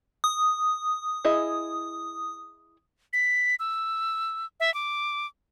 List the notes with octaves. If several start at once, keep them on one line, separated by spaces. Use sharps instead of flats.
D#6
E4 G#4 D#5
B6
E6
E5
D6